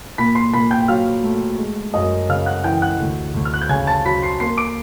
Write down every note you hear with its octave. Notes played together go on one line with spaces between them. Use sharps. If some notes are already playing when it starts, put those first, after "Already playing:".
A#2 B5 B6
C6 C7
A#2 B5 B6
G5 G6
F#3 F5 F6
A3
G#3
F#2 D#5 D#6
C#3 F5 F6
F#5 F#6
E3 G5 G6
F#5 F#6
D2
D2
F6
F#6
G6
C#3 G#5 G#6
A5 A6
F#3 B5 B6
C6 C7
A#3 C6 C7
D6 D7